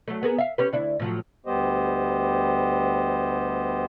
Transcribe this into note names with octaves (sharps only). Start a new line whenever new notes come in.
F#3 A3
B3 G#4 A#4
E5 F5
C#4 G4 B4
D2 D4 E4
A2 F3 F#3
D2 G3 B3 G4 C5 D#5